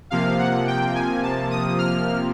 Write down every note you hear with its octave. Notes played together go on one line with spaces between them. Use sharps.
C3 F3 A#3 F5
F#5
G5
G#5
A5
D#6
F6